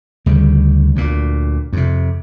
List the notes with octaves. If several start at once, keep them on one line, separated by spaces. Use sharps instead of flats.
D2 C#3 G3
D2 A#2
F2 C3